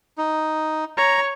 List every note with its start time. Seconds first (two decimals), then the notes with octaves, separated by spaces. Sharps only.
0.18 D#4
0.97 C#5 A#5